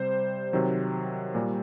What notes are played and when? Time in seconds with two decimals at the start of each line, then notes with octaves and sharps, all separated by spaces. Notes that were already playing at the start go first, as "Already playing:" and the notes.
Already playing: C3 G3 C5
0.53 C3 D#3 F#3
1.35 A#2 G3